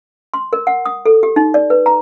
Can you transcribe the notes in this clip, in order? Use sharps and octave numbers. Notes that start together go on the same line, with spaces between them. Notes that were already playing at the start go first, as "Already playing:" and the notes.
C6
A#4
F#5
D#6
A4
G4
D#4
D5
B4
A#5